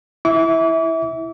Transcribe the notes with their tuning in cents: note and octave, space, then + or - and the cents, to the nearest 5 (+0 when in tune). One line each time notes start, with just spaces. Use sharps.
E4 +0 E5 -20 D6 -40